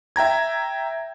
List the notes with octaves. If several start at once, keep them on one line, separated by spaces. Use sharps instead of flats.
E5 G5 A#5 G#6